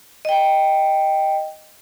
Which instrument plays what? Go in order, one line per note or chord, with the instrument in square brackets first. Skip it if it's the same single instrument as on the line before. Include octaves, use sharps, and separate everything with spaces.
[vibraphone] D#5 G5